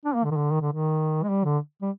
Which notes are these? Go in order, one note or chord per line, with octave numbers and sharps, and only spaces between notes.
D4
A#3
D3
D#3
D3
D#3
D3
D#3
G#3
G3
D3
G3